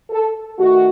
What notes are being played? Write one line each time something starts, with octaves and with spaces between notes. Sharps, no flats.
A4
D#3 A3 F#4